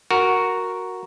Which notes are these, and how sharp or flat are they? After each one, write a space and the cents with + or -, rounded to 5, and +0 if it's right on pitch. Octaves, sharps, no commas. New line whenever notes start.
F#4 +0 A#4 +0